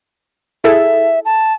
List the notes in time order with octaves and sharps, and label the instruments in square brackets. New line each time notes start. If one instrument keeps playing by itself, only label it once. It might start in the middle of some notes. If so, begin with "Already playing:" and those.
[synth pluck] E4 G#4 A4 [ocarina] E5
[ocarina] A5